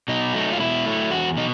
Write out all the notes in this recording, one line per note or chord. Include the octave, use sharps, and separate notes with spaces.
B2 D#4
F#3 A3
F4
B2 E4
F#3 A3
E2 F#4
B2 D#4